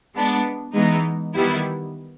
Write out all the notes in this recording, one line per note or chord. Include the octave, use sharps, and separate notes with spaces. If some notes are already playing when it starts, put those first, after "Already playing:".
G#3 B3 D4
E3 G#3 B3 D#4
D#3 G3 B3 E4